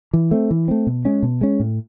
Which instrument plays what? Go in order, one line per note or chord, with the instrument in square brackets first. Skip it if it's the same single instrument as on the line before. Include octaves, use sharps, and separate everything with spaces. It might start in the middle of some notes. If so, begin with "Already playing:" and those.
[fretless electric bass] E3
A3 C4
E3
A3 C4
B2
G#3 C#4
B2
G#3 C#4
A2